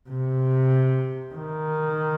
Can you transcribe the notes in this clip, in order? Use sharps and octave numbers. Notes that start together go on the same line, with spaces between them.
C3
D#3